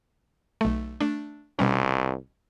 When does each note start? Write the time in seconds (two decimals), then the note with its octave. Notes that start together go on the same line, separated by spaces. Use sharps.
0.61 B1 A3
1.01 A3 D4
1.59 C2 B2 G3 C#4